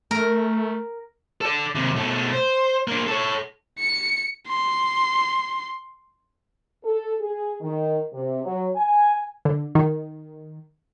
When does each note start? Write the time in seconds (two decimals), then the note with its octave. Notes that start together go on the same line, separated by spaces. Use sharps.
0.11 A3 A#4
1.41 A4 D5
1.75 D#2 C3
1.96 B2 A3
2.32 C5
2.88 A#3 D4
3.07 A4 C#5
3.79 C#7
4.48 C6
6.83 A4
7.20 G#4
7.61 D#3
8.13 C3
8.44 F#3
8.75 G#5
9.45 D3
9.75 D#3